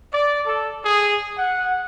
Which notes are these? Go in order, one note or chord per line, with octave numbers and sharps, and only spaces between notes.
D5
A4
G#4
F#5